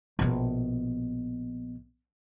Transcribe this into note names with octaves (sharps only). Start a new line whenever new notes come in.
A#1 B2